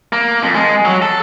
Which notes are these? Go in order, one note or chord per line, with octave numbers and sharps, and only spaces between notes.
A#3
F2
G#3
F#3
A4